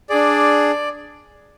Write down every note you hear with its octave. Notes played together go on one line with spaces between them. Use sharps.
D4 G#4 D5